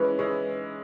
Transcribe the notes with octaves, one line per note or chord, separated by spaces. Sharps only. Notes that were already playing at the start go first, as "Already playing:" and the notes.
Already playing: E3 G#3 C#4 E4 B4
E3 G#3 C#4 E4